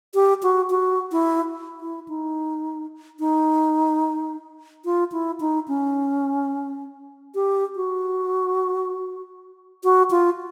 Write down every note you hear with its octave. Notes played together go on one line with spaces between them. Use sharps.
G4
F#4
F#4
E4
E4
D#4
D#4
F4
E4
D#4
C#4
G4
F#4
F#4
F4